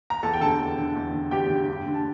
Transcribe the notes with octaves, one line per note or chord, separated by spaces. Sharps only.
A#5
E2 A4 A5
G5
D3 A4 A5
E2
D3
E2
D3
E2 G4 G5
D3
G2
D3
A5